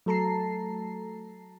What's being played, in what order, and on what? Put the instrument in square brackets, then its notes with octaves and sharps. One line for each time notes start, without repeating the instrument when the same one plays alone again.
[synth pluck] F#3 A3 A4 A5 A#5 C7